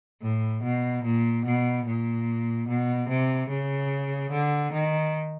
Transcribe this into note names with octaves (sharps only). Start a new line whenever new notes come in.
A2
B2
A#2
B2
A#2
B2
C3
C#3
D3
D#3